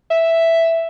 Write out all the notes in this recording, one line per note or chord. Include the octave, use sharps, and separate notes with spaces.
E5